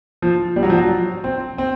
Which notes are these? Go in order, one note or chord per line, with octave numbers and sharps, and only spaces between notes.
F3
G3
F#3
F3
F#3
C4
C4